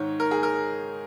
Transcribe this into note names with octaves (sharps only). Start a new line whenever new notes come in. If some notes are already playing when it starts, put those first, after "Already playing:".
Already playing: G#2 D#3 C#5
A#4
G#4
A#4